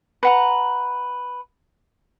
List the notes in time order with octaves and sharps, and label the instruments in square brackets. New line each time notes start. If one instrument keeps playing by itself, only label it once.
[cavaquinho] B4 F#5 A#5